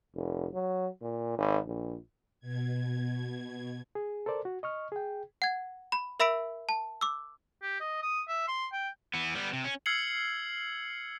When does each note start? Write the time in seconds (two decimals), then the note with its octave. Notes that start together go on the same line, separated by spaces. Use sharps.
0.15 F1
0.54 F#3
1.02 A#2
1.38 G#1
1.67 A#1
2.40 B2 G#6
3.95 G#4
4.26 A4 A#4 C5 D5
4.45 F#4
4.63 D#5 C#6 F6
4.92 G#4 G5
5.42 F#5 G#6
5.92 B5
6.20 A#4 E5 B5 E6 B6 D7
6.69 A5
7.01 D6 E6
7.62 G4
7.80 D#5
8.02 D#6
8.28 E5
8.48 C6
8.72 G5
9.14 E3 B3
9.35 G3 B3
9.53 C3
9.64 C#4
9.86 E6 F6 G#6 C7 C#7 F#7